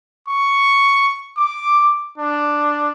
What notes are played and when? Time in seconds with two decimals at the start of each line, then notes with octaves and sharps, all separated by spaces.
0.28 C#6
1.37 D6
2.18 D4